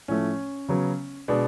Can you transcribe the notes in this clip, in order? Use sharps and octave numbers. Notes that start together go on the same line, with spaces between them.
A2 F3 A3 C#4
C#3 F#3 B3
B2 G#3 B3 D4